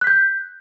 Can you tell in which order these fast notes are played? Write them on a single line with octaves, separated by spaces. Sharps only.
F#6 B6 G6